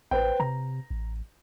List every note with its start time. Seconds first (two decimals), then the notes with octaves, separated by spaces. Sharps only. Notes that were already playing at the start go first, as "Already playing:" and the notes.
0.11 A1 B4 C5 G5
0.40 C3 A#5
0.90 A1